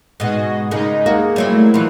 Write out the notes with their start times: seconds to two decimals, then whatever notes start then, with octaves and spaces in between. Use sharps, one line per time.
0.20 G#2 B2 F#4 G#4 D#5
0.71 C#3 G#3 A#3 D#4
1.06 A#3 F#4 G#4 A#4
1.36 F#3 G3 A3 C4 E4
1.74 E3 F3